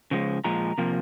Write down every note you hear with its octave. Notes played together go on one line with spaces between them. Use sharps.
C#3 F3 G#3
A#2 F3 G#3 A#5
C3 F3 A#3